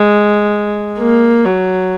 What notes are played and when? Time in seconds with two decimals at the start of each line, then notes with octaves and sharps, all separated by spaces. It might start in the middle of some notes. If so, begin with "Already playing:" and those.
Already playing: G#3
0.99 A#3
1.45 F#3